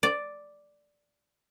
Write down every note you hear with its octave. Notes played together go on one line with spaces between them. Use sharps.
D5